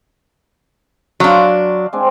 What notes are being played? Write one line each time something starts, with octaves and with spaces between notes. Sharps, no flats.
F#3 D4 F5 C6
G#3 C4 D4